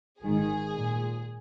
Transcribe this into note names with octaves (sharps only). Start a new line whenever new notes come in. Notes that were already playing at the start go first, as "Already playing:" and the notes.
G#1 G#2 D#3 G#4
A#2